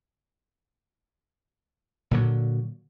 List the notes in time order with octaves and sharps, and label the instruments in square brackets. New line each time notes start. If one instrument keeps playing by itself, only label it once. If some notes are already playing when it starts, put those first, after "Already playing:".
[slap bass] A#2 D3 F#3